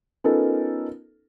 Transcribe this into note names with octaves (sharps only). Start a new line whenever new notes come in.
B3 C#4 D#4 F4 A4 A#4